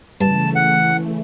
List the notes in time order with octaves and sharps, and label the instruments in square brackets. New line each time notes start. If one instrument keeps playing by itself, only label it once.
[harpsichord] G2 [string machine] C#3 E3 A3 [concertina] A5
[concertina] F#5